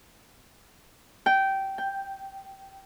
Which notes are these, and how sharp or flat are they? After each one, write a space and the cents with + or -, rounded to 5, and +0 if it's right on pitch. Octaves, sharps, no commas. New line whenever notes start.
G5 -15
G5 +5